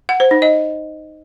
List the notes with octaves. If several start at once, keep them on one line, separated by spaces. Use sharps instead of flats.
F#5
C5
D#4
D#5